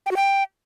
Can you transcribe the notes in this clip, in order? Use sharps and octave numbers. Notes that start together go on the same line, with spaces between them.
G5
F#4
G5